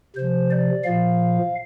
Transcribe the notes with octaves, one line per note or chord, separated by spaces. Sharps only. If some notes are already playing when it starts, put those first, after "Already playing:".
C3 F3 C5
D5
A#2 F3 F5